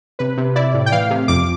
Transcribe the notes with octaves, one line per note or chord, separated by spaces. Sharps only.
C3 B4
C3
E4 D5
A2
G5
E3 F5
C3
F2 D6